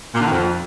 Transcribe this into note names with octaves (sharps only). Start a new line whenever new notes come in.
A#2
D3
D#3
F2